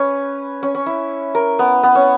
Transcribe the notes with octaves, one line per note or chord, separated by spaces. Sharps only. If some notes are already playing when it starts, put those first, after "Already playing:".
Already playing: C#4 B4
C#4
C#4
E4
A#4
B3
B3
C#4